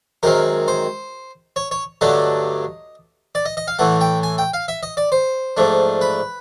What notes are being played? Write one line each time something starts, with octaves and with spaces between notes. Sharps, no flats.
F#2 D#3 G#3 C4 A#4
C5
C#5
C#5
G2 D3 F#3 A3 D4 D#5
D5
D#5
D#5
F5
A2 E3 A3 F#5
G5
G#5
G5
F5
E5
D#5
D5
C5
G#2 F3 A3 D4
B4